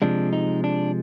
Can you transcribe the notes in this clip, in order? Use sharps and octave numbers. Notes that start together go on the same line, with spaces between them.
C3 F3 G#3 D4
D#4
D4